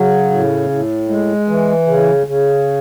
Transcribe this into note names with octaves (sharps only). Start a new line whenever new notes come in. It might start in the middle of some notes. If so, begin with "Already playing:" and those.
Already playing: C#3 F#3
A2
A2
G#3
E3
C#3
C#3